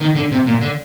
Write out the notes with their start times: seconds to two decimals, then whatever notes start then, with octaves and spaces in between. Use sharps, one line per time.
0.01 D#3
0.15 D3
0.31 C3
0.47 A#2
0.62 D3